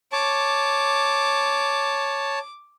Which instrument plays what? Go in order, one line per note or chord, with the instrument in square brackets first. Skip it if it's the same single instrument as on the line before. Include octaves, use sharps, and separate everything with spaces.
[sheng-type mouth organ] C#5 A5 [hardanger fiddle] D6